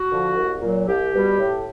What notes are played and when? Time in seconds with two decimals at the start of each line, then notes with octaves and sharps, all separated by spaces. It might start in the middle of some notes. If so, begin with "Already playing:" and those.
Already playing: F#4
0.10 D3 F3
0.36 C2
0.61 A#2 F#3
0.87 C2 G4
1.13 B2 G3
1.38 A2